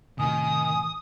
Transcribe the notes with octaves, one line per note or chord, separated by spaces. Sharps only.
A2 C3 D#3 G#5 D#6